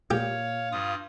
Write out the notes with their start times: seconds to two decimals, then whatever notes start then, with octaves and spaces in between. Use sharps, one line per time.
0.11 A#2 G4 C#5 F5
0.72 G2 F4 D#6